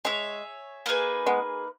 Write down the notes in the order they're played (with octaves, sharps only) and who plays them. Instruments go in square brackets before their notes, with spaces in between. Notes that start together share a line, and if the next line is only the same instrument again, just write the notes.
[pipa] G#3 [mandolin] G#4 C#5 E5
[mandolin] A#3 D#4 G#4 B4
[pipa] G#3 B3